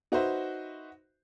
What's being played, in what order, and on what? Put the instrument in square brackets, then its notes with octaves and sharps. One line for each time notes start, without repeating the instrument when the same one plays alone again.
[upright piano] D#4 F#4 B4 C5 E5